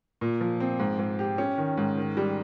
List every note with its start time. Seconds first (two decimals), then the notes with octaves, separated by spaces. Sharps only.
0.21 A#2
0.41 F3
0.60 C4
0.80 G#2
0.99 G#2
1.19 G4
1.38 C#4
1.58 D#3
1.78 G#2
1.97 D#3
2.17 G3